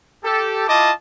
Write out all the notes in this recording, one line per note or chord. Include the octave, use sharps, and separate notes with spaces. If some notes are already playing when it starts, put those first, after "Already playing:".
G4 A4
E4 F4 D#5 A5 D6